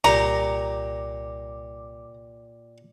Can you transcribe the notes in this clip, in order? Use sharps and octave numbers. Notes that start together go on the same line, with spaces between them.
C2 A#2 G4 A#5 D6